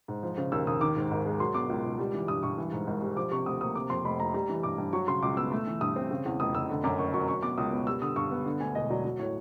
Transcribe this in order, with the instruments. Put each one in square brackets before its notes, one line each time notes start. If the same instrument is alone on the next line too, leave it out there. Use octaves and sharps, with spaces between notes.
[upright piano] G#2
F3
C#3
D#2 E6
D#2 D#6
D#3 D6
G#2
G#1
G#3
F#3 C6
B2 D6
C#2
C#2
G3
E3
G2 D#6
G2 C#6
E3
G#2
G#1
G3
F3 D6
C3 C#6
D2 D#6
A#3 D#6
C3 D6
F2 C6
F1 B5
F1 A#5
G3 A#5
E3
G2 D6
G2
F#3 C#6
C#3 C6
C#2 D6
B3 E6
A3
E3
G2 D#6
C4
C#3
E2
F1 D#6
F1 E6
D3
F#2 D6
F#1 C#6
F#3 C#6
F#3 C#6
B2 D6
C#2 D#6
B3
G3 E6
D3 D#6
G2 C#6
B3
D3
D2 G#5
E1 D#5
F#3 D5
F#3
A2 C#5